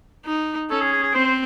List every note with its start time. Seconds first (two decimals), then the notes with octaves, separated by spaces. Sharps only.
0.26 D#4
0.70 C#4 A4
0.81 G#4
0.93 G#4
1.03 G#4
1.14 C4 C5
1.25 C5